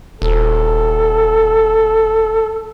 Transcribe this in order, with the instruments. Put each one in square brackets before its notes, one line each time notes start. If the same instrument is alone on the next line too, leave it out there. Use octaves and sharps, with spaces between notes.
[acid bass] D#1 [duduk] A4